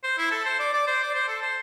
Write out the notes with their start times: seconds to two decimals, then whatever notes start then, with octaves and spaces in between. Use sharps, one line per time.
0.03 C5
0.18 E4
0.31 A4
0.45 C5
0.59 D5
0.73 D5
0.87 C5
1.03 D5
1.14 C5
1.28 A4
1.42 C5